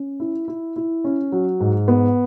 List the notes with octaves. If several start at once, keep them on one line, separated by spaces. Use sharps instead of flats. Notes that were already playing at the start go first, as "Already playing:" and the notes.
Already playing: C#4
E4
E4
E4
C#4
F#3
G#2
B3